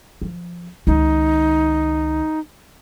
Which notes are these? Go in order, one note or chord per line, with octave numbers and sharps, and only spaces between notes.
F3
C#2 D#3 D#4